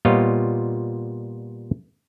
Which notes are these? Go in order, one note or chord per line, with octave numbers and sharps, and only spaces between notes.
A#2 G3 B3 F4 C#5 D#5